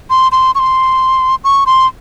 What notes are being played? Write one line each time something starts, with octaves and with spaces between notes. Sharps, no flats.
C6
C6
C#6
C6
C#6
C6